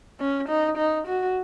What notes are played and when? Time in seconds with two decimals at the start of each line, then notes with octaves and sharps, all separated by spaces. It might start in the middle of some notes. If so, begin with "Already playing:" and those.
0.20 C#4
0.48 D#4
0.77 D#4
1.07 F#4